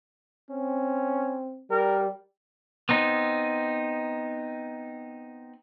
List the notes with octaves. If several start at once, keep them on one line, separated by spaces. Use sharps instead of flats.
C4 C#4
G3 A#4
B3 C4 D#4